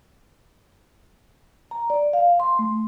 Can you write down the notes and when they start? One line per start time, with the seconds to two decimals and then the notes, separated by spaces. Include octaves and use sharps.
1.71 A#5
1.90 D5
2.13 F5
2.40 C6
2.59 A3